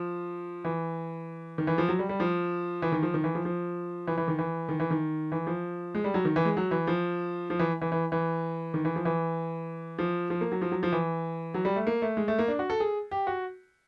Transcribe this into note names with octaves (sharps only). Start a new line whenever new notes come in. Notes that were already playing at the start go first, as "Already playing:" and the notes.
Already playing: F3
E3
D#3
E3
F3
F#3
G3
G3
F3
E3
D#3
F3
D#3
E3
F3
F3
E3
E3
D#3
E3
D#3
E3
D#3
E3
F3
G#3
G3
F#3
D#3
E3
G#3
F#3
E3
F3
F3
E3
E3
E3
E3
D#3
E3
F3
E3
F3
F3
A#3
F#3
F3
F#3
F3
E3
F#3
G3
A3
A#3
A3
G#3
A3
A#3
D4
F#4
A4
G#4
G4
F#4